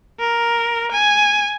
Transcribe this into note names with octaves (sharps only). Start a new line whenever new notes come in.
A#4
G#5